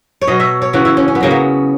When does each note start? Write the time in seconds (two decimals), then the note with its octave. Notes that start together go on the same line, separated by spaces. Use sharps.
0.21 C#5
0.27 B2 F#3 D#5
0.40 E5
0.62 C#5
0.73 C#3 E3 F#4
0.85 E4
0.97 C#4
1.08 C#4
1.15 B3
1.20 C#3 F#3 A#3
1.31 B3